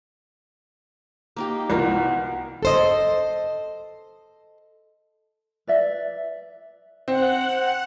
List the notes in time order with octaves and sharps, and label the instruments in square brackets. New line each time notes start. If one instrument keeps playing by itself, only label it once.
[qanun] A#3 D#4 G4
[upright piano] C2 A#4 [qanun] B3 F4 F#4
[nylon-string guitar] A4 C5 D#5
[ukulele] B4 D5 E5
[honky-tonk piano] C4 [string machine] F#5